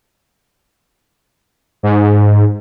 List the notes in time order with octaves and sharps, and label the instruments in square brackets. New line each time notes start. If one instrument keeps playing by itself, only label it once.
[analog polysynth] G#2